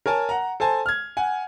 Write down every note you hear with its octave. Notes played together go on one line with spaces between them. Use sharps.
A#4 C#5 G#5 A5
F#5 A#5
A4 C5 G#5 A5
F6 G#6
F#5 G#5